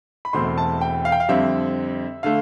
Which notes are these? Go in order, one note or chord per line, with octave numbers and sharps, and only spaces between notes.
B5
E1 E2 B2 A3 C4 C6
A5
G5
F5
G5
F5
F2 D3 G3 C4 E5
D3 A3 F5